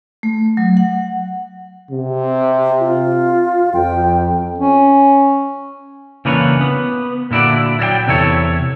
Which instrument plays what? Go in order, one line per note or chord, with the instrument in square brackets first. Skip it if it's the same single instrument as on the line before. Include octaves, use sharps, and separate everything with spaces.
[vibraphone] A3
F#3
F#5
[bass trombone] C3
[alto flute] F4
[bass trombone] F2 [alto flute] G5
[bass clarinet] C#4
[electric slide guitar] C#3 E3 A#3 D4 B4 C#5
B3
A#2 D3 E4 F#4 D5
F#3 D5 E5 G5
E2 C3 E4 A4 C#5